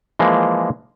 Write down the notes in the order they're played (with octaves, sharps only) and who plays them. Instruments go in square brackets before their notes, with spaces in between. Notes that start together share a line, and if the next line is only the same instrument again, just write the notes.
[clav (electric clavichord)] E3 F3 G#3 A#3